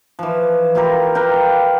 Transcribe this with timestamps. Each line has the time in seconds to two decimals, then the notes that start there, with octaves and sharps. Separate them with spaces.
0.19 E3 F3
0.75 E4 F4 G4 A#4
1.15 A#4 B4 F5 G5